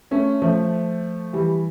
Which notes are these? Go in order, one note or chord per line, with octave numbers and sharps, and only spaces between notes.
A3 C#4
F3 A3
E3 G3